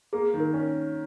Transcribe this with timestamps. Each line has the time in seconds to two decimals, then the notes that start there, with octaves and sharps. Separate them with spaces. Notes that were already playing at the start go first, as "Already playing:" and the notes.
0.13 A#3 G#4
0.34 D#3
0.40 A#4
0.54 C#4